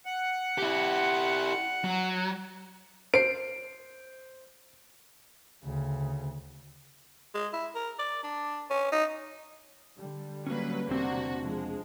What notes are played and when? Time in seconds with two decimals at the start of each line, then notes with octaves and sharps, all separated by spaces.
0.06 F#5
0.58 E4 G4
1.84 F#3
3.14 C5 C7 D7
5.64 D2 C#3
7.34 G#3
7.53 E4
7.75 A#4
7.99 D5
8.23 D4
8.70 C#4
8.92 D#4
9.96 D3 G3
10.47 F#3 A#3 C#4 B4
10.89 E1 C3 A#3 C4 D4 F#4 C5 D5
11.44 F3 G#3